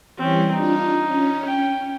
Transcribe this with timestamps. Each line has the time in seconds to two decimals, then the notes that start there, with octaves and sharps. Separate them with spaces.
0.17 E3 G3 C4 C#4
0.53 D4 D#4 F4
1.02 C#4
1.45 G5